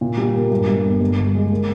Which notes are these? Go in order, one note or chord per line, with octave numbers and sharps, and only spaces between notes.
A#2
G3
A#3
G2
G2
G1
G2
G2
G#3
A#3